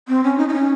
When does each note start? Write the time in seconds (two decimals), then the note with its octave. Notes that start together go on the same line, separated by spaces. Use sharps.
0.08 C4
0.24 C#4
0.38 D#4
0.49 D#4
0.53 C#4